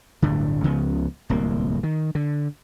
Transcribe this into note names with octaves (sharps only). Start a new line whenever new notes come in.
D1 G1 A2 D3
C#2 C#3 F3 B3
D1 C2 A#3
D#3
D3